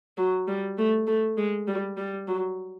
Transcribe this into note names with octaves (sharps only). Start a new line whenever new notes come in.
F#3
G3
A3
A3
G#3
G3
G3
F#3